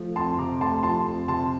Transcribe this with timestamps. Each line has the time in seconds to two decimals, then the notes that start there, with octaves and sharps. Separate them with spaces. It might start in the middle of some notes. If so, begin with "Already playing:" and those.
Already playing: F3 A3
0.16 F2 A5 C6
0.38 C3 A#5 D6
0.60 A3 A5 C6
0.83 F3 A5 C6
1.06 F2
1.28 C3 A5 C6